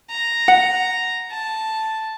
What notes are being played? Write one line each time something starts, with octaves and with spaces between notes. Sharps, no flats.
A#5
F#5
A5